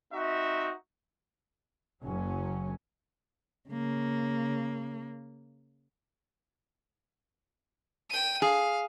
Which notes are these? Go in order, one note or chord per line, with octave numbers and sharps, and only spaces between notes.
C4 D#4 F#4 E5
F#1 F#3 C#4
C#3 A#3
G5 D#7
G#4 F5